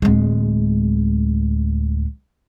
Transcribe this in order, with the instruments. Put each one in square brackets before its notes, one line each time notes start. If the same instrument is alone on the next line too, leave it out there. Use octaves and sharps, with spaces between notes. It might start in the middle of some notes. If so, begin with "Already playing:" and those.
[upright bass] D1 G#3